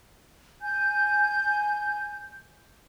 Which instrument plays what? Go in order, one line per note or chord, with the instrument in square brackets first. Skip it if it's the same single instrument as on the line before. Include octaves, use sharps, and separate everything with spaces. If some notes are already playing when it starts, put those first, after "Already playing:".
[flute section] G#5 G6